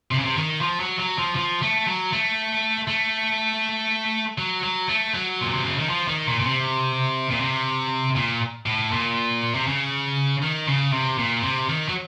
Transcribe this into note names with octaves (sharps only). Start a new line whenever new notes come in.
C3
C#3
C3
D#3
F3
F#3
F#3
F3
F3
A3
F#3
A3
A3
F#3
F#3
A3
F#3
A#2
C3
C#3
D#3
F3
D#3
A#2
A#2
C3
A#2
C3
A#2
A2
A#2
C3
C#3
D#3
C#3
C3
A#2
C3
D#3
F#3